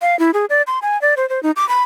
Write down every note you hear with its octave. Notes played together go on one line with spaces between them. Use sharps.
F5
E4
G#4
D5
C6
G#5
D5
C5
C5
D#4
D6
B5